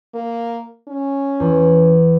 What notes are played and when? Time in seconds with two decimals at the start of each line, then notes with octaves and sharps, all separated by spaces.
0.14 A#3
0.88 C#4
1.40 E2